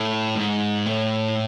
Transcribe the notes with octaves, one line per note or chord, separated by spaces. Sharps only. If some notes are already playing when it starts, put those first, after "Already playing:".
Already playing: A2
G#2
A2